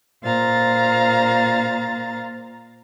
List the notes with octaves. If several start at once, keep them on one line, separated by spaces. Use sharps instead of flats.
A#2 C5 F5 A#5 A6